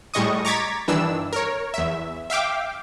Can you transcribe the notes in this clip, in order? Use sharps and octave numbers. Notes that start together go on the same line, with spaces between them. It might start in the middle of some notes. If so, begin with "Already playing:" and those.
A2 G3 G#3 D#5 C#6 D#6
A#5 C#6 D6 G#6 A6 B6
G2 D#3 E3 D4 E6
A#4 C#5
E2 E5
E5 F5 G5 D6